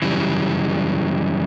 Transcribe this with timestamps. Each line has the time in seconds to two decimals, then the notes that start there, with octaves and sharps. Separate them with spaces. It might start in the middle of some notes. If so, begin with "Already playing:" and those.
0.02 F#2 C#3 E3 G3